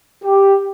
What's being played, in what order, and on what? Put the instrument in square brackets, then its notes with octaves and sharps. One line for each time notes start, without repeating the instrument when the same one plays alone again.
[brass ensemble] G4